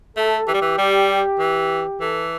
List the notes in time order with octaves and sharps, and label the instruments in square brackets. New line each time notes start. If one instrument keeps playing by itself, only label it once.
[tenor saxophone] A3 [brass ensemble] A4
[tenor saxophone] E3 [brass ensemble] G4
[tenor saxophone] G3
E3
G3
E3
[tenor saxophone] E3 [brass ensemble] A4